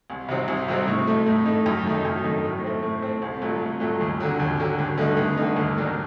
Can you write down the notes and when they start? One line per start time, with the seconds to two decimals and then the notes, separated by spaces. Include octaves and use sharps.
0.10 C2
0.29 C3 F#3 C4 D#4
0.48 C2
0.68 C3 F#3 C4 D#4
0.88 A2
1.07 A3 D#4
1.26 A2
1.46 A3 D#4
1.66 F#2
1.86 D#3 A3 D#4
2.05 F#2
2.24 D#3 A3 D#4
2.44 A2
2.63 A3 C4
2.83 A2
3.02 A3 C4
3.22 C2
3.42 A#2 F#3 A3
3.61 C2
3.80 A#2 F#3 A3
4.01 D#2
4.20 D3 F#3
4.40 D#2
4.59 D3 F#3
4.78 G2
4.98 D3 A3 D#4
5.17 G2
5.37 D3 A3 D#4
5.56 D#2
5.76 D#3 F#3 A#3 D4